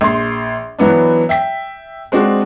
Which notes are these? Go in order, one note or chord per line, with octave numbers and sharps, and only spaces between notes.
A#1 C6
E3 F#3 B3 D4
E5 G5 B6
G#3 C4 D4 F#4